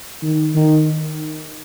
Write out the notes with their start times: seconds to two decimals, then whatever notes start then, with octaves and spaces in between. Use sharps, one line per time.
0.22 D#3
0.55 D#3